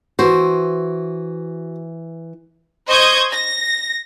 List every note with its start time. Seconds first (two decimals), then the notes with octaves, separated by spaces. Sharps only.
0.19 E3 F#4 C5
2.87 C5 D#5 C#6 D#6 G6 G#6
3.31 A#6